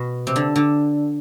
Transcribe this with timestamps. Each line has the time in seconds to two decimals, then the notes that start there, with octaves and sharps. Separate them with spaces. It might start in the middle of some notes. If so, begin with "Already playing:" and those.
Already playing: B2
0.27 C3
0.36 D3
0.56 D3